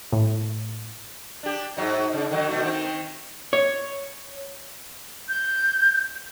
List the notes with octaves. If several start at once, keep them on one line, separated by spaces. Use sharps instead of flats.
A2
D4 G4
G#2 F#3 D#4
C#3
D3 D#3 F#3
B2 A3 F#4
D#3 C4
C#5
G6